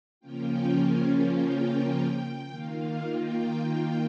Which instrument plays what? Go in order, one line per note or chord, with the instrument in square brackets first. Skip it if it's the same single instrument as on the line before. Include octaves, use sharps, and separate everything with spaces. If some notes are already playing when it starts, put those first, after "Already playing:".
[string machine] C#3 F3 A#3 C#4 F4 G5
G#5
G5
G5
D#3 A#3 F4 F5
G5